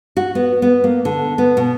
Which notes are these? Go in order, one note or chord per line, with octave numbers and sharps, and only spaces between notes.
F#4
B3
B3
A#3
D3
B3
B2